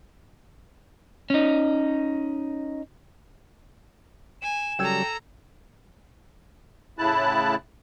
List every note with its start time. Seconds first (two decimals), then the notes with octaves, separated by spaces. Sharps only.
1.30 C#4 D#4
4.42 G#5 E7
4.79 C#3 F#3 G3 A4 G5 A#5 E6 G#6
6.98 A2 C#3 E4 A5 F#6